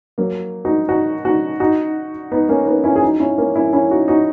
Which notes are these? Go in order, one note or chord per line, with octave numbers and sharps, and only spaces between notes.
F#3 A#3
D#4 F#4
D#4 F#4
D#4 F#4
D#4 F#4
B3 D#4
A#3 C#4
B3 D#4
C#4 E4
G#4
D#4 F#4
C#4 E4
A#3 C#4
C#4 E4
C#4 E4
D#4 F#4
D#4 F#4